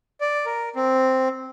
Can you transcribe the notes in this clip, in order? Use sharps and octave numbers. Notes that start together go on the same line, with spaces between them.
D5
A#4
C4